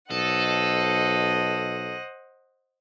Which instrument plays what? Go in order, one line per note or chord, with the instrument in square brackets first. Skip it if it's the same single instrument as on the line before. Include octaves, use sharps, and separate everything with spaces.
[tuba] B1 [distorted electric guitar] A4 [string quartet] C5 D#5 F#5